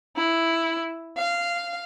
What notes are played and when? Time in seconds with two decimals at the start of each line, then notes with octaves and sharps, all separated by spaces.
0.17 E4
1.19 F5